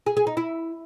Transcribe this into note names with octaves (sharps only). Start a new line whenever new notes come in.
G#4
G#4
D#4
E4